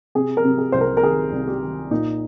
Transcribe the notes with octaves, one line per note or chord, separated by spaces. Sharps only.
C3 G#4
A#4
C3
G#4
C2 C5
A#4
A#4
D#3 G#4
C2
G4
D#3
A#2 D#4